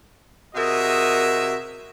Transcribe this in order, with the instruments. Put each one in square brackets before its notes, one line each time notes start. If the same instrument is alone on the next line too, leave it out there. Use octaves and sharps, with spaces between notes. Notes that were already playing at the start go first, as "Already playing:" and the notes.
[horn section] C3 F#4 G#4 A#4 D#5 E5